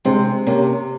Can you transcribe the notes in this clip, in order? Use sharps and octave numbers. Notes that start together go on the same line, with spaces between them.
C3 G#3 C4
C3 A#3 C#4